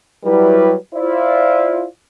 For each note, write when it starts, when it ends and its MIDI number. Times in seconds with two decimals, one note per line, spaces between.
0.24 0.74 54
0.24 0.74 55
0.24 0.74 64
0.24 0.74 71
0.95 1.85 64
0.95 1.85 65
0.95 1.85 72
0.95 1.85 74